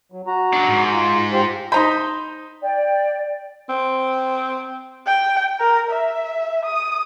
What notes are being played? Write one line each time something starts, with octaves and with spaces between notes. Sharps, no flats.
F#3
F#4 A#5
F#3 D4
G#2
F4
F4 G4 C5
D#4 C5 A#5 B5
D5 G5
C4
G5
A#4
E5
D#6